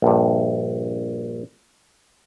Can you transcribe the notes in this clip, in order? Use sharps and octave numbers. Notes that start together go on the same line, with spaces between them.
A#1 G2